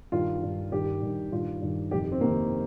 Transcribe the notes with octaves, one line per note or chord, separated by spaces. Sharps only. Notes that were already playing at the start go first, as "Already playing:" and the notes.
G2 D#3 F4
G2 D#3
G2 D#3 G4
G2 D#3
G2 D#3 F4
G2 D#3
F2 C3 D#3 G4
C4
F2 C3 D#3 A#3